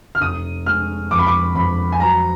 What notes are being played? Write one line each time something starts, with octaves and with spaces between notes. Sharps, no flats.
F6
F1 D#6
G#3 F6
F2 D6
B5
D6
F2 B5
G#5
F#3 A#5